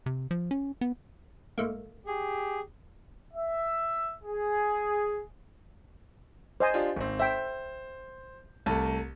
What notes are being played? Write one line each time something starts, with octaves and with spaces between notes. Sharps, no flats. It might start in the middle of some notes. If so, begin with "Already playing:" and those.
C3
F3
C#4
B3
G#2 A3 A#3
G4 G#4
E5
G#4
C5 D#5 G#5
D4 F4 G4
G#1 C4
C5 E5 G5
C2 A3 A5